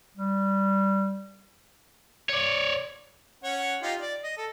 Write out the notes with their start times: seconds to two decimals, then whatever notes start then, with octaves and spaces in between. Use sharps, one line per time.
0.17 G3
2.29 C#5 D5
3.43 C#4 C#5 F#5
3.82 D#4 F4 G4
4.00 D5
4.24 D#5
4.37 A4